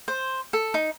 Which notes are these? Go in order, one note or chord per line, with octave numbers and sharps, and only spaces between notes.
C5
A4
D#4